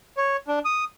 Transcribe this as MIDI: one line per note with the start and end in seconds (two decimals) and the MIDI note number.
0.17 0.36 73
0.48 0.59 62
0.65 0.84 87